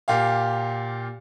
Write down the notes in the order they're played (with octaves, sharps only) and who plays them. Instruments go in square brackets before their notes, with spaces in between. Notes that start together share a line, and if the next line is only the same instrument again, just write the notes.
[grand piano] A#2 G4 F5